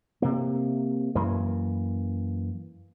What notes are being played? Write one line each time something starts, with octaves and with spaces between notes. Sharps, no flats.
C3 A#3
F#2 E3 A#3